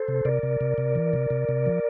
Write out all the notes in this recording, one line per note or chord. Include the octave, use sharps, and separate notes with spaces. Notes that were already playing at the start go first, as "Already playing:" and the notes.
Already playing: A4 C5
C3
C3 A#4 D5
C3
C3
C3
E3
C3
C3
C3
F3